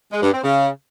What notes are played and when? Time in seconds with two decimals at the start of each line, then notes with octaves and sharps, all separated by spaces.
0.12 G#3
0.22 G2
0.33 C4
0.43 C#3